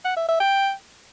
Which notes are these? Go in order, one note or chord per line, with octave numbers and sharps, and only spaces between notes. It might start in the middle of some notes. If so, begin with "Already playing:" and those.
F#5
E5
E5
G5